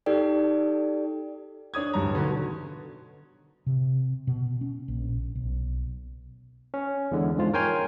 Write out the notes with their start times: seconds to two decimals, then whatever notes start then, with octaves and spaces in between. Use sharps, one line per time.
0.06 D#4 G4 A4 D5 G5
1.74 D4 C#5 D#6 G#6
1.94 D1 G2 A#5
2.13 B2 D3 D#3 F#3
3.66 C3
4.27 B2
4.61 C#4
4.88 A#1
5.35 B1
6.74 C#4
7.11 E2 D3 G#3
7.38 G#2 F3 G#3 F4
7.53 A#4 C#5 G5 G#5 C6 F6